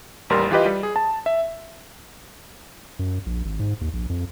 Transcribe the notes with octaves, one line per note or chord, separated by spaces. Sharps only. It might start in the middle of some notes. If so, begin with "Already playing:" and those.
A1 D#2 G3 A#4 C6
E3 F4 G4 B4 D#5
G3
G#4
A5
E5
F#2
A#1
G#1
G#2
D#2
A#1
F2